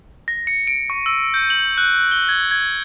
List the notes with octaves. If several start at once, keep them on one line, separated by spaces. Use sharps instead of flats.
A#6
C#7
D7
C#6
E6
G6
F#7
F#6
G7
G#6
G#6